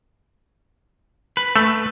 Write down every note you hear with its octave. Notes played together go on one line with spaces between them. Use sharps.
B4
A3